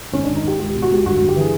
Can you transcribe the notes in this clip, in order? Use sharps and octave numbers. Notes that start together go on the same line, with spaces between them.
G#1 C#4
G#1 D4
D#4
G#1 G4
C#2 G4
B2
F#4
C#2 G4
G1 F#4
G1 F#4
G4
E3 G#4